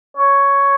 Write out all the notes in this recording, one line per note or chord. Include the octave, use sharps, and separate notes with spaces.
C#5